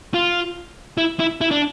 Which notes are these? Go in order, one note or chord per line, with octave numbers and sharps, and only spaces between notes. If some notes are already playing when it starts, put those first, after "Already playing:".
F4
E4
E4
E4
D4